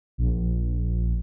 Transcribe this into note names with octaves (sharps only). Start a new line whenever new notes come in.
A#1